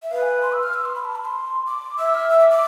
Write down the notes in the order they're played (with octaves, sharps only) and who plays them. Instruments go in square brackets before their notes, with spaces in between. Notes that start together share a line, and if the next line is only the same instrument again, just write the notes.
[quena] E5
[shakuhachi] B4 [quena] F5
[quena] G#5
C6
E6
F6
E6
C6
B5
A5
B5
C6
D6
[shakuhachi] E5 [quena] E6
[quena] F6
E6
D6
D6